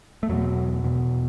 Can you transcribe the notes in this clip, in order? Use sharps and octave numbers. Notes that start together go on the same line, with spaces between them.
A3
E2 B2 F#3
E2 B2